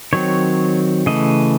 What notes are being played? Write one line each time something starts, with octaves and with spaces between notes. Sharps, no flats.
D#3 F#3 C4 C#5
C#3 E3 A3 D#5